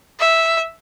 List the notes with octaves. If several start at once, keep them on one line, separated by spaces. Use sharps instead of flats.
E5